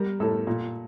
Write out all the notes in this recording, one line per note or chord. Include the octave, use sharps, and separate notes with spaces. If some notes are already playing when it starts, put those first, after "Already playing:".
Already playing: G3 A#4
A2 A4
A#2